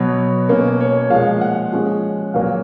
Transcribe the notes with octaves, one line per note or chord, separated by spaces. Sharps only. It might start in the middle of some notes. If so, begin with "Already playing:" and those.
Already playing: B2 F#3 B3
B2 A#3 C#4
C#5
A#2 F3 G#3 F5
F#5
F3 G#3 C#4
A#2 F#3 A#3 F5